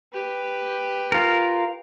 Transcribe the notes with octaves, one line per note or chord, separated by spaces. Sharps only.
G4 B4
F4 A#4